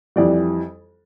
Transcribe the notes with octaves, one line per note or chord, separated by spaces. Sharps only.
F2 E3 G3 D5